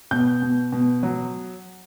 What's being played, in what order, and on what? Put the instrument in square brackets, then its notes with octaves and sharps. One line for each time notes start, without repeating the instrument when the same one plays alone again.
[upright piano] B2 G6
B2
B2
F#3